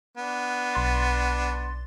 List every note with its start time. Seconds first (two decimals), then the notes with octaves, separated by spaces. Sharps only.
0.17 B3 D4
0.74 B1 C6 A6